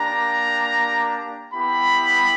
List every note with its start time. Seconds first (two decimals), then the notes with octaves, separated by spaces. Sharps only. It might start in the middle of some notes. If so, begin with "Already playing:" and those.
Already playing: A#3 D4 G4 A#5
1.53 B3 E4 G4 B5